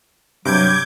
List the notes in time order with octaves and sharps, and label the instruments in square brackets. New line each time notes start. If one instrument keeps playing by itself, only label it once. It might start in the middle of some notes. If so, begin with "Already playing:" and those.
[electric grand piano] G2 C3 [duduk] F#3 [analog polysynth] D6 G6 G#6